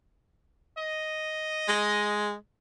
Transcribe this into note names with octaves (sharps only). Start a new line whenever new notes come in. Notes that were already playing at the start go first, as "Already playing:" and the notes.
D#5
G#3